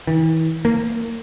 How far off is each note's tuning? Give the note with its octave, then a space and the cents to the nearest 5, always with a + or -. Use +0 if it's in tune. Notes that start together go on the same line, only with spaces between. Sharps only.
E3 -40
A#3 -25